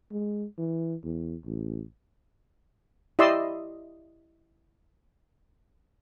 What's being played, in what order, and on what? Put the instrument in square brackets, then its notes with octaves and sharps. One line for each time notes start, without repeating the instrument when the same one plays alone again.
[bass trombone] G#3
E3
E2
A1
[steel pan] E4 G4 D5 D#5 C6 E6